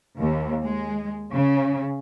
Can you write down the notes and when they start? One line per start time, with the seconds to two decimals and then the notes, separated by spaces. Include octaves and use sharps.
0.18 D#2
0.63 G#3
1.32 C#3